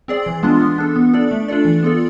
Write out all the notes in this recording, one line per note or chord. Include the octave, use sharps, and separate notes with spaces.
C4 G#4 D5
E3
G#3 B3 D4 F4
B3
D4 A4
B3
D4 A4 D5
A3
D4 F4 A4 D5
E3
B3 F4 A4 D5